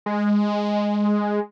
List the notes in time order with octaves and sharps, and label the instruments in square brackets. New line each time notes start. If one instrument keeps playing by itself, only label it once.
[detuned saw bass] G#3